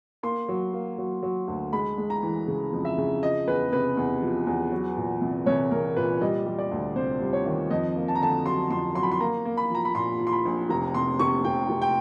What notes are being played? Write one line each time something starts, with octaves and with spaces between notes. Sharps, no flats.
A#3 C6
F#3
A#3
F#3
F#3
D2
G#3 B5
G#3
A#5
E3
C#3
F2
E5
C#3
F3 D#5
E2 B4
C3 B4
E2
F3
E2
F#3
A#2
C2
C2 C#5
C2 A#4
A#2 B4
G3 D#5
G3
D5
D2
C3 C5
G3
C#5
D#3
F2 D#5
A#3
A5
A#5
D3 A5
F#3 C6
F2 C6
F#3 C6
B5
C6
A#3 A#5
A#3
B5
F3 A#5
B5
A#2 C6
F3
C6
B5
A#1
F1 A#5
C3 C6
F1 C#6
F1 G5
F1
G5